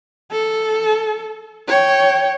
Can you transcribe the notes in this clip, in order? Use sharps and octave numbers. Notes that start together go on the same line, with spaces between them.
A4
C#5 G5